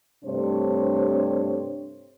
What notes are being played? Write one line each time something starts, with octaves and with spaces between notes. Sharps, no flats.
G2 C3 A3 D4 C5 C#5